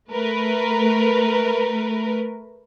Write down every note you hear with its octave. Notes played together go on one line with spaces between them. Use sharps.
A3 A#4 B4